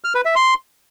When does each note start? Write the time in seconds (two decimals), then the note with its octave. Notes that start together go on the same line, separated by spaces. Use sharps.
0.04 F6
0.15 B4
0.25 E5
0.36 C6